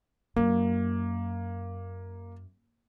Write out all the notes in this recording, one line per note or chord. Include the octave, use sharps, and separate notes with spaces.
F#2 A#3